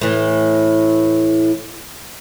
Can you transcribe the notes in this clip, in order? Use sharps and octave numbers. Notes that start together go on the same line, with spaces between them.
A2 E3